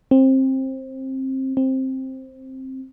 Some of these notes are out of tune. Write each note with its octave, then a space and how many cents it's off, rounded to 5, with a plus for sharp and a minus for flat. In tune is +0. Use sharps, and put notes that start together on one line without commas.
C4 +20
C4 +10